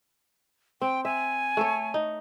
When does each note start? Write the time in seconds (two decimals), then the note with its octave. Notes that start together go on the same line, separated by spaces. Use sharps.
0.82 C4 G5
1.05 E5 G#5
1.57 A3 A4 C#5
1.94 D#4